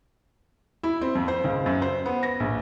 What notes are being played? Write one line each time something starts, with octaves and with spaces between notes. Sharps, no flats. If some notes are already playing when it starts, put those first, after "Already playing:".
E4
C4
F2
C5
C#2
F#2
C5
B3
A#6
A#1